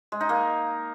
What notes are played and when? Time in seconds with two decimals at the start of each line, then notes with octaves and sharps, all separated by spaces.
0.12 G#3
0.21 D#4
0.29 A#3